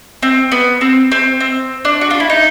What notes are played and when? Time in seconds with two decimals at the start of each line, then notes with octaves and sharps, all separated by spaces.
0.23 C4
0.52 B3
0.81 C4
1.12 C4
1.40 C4
1.85 D4
2.01 F#4
2.10 F4
2.20 E4
2.30 D#4